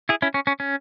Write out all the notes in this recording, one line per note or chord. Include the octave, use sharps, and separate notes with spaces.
E4 G#4
C#4 E4
C#4
C#4
C#4